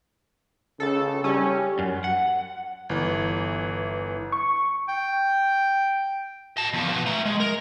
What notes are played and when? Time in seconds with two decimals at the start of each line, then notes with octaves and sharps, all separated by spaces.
0.80 C#3 A4
1.24 G3 C#4
1.79 F#2
2.04 F#5
2.89 G1 E3
4.32 C#6
4.88 G5
6.57 D#5 A5
6.74 E2 F3
6.90 B2
7.06 A3 A#5
7.26 G#3
7.40 A#4